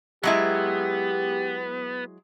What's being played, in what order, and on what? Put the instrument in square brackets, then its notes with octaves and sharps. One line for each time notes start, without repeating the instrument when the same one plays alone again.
[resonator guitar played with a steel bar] F#3 G#3 E4 [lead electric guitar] B3 [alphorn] G4